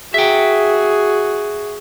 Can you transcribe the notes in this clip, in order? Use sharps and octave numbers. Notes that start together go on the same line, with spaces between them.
F#4 G#4 E5 G5